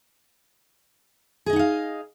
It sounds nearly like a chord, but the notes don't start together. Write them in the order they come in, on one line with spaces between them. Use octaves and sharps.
G#4 D#5 D#4 F#5 F5